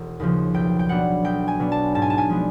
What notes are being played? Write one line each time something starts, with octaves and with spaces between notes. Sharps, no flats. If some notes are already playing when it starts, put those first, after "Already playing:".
Already playing: E1
D#2 C#3 F3
B1 G5
G5
B2 F#3 B3 D4 F#5
B1 G5
G#5
B2 F#3 B3 D4
A5
G#2 A5
G#5
A5
G#5
F3 G#3 B3 D4